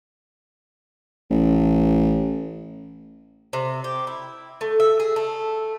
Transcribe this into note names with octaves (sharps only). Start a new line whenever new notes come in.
A1
C3
G4
E4
A3
E5
G#4
A3